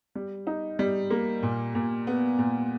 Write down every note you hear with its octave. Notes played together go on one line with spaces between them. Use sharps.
G3
D#4
G3
A#3
A#2
A#2
B3
A#2